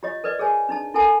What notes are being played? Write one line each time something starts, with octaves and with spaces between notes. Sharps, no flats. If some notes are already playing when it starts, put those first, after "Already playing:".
F4 G4 C#5 D#5
A#4 B4 D5 D#5
G#4 A#4 C#5 G#5
D4 D#4 A5
E4 A4 A#4 F#5 G#5 A5